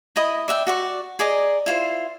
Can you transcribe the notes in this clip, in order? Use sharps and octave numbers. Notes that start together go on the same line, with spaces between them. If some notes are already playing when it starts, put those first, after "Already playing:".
E4 D#5 B5 D#6
D5 E5 F#5 G5
F#4 D5 C#6
G#4 D5 D#5 A#5
E4 F4 C5